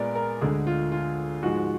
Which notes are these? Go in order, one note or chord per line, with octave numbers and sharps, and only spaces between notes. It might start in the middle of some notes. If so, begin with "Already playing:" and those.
Already playing: A#2 G#3 B3 A#4 D5
A#4
D2 D3 G#3 G#4
F4
F4
G#2 F3 G#3 F#4